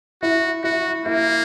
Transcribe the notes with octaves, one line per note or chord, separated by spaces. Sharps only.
E4 F#4
E4 F#4
A#3 E4